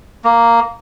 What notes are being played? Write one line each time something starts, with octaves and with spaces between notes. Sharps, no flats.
A#3